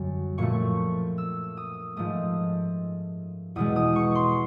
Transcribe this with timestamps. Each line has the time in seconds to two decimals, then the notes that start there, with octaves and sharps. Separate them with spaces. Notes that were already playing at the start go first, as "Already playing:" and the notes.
Already playing: F#2 D3 G3
0.38 A#2 F3 A3 C#6
1.18 E6
1.57 D#6
1.97 G#2 F3 A3 D#6
3.56 E2 B2 G#3 D#6
3.76 D#6
3.96 C#6
4.15 C6